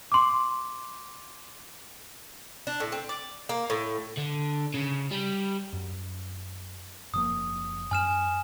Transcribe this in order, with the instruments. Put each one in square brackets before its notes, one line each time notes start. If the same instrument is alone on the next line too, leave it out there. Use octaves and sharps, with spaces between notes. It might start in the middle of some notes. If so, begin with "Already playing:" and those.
[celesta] C6 D6
[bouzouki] D4
A2
C4
D5
A#3
A2
[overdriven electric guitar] D3
C#3
G3
[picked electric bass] F#2
[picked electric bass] F#1 F3 A#3 [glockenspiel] D#6
[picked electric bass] F#2 [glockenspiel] G#5 F6 E7